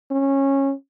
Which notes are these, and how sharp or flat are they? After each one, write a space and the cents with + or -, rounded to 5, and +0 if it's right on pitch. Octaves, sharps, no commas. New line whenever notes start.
C#4 -15